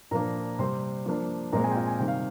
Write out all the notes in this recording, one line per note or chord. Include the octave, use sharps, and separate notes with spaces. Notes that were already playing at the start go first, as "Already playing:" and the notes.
A#2 F3 A#3 D4 A#4 A#5
C3 G3 C4 C5 C6
F3 A#3 D4
A#2 F3 G#3 C4 A#4 A#5
G#4 G#5
G5
F4 F5
G#5
C3 D#3 G3 G5
F5